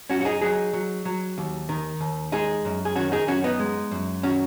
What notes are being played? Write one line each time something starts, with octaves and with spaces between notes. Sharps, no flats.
F#2 C#4 F#4
F#4
D#4 G#4
F#3 D#4 G#4
F#3
F#3
D#2
D#3
D#2
G#3 D#4 G#4
F#2
G#4
D#3 C#4 F#4
D#4 G#4
F#2 C#4 F#4
B3 D#4
G#3
F#2
D#3 C#4 F#4